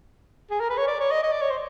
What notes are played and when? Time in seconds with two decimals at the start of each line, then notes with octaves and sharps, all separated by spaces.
0.51 G#4
0.60 A#4
0.70 B4
0.78 C#5
0.88 D5
1.00 C#5
1.11 D#5
1.24 D#5
1.32 D5
1.41 C#5
1.50 C5